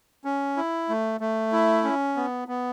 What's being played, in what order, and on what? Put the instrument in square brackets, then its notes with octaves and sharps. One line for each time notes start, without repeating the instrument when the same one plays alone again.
[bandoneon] C#4
E4
A3
A3
E4
C#4
B3
B3